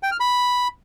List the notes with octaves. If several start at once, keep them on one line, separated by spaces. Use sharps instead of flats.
G5
F6
B5